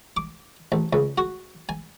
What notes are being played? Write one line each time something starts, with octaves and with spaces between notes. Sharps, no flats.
D6
A1
C#2
F#4
G#5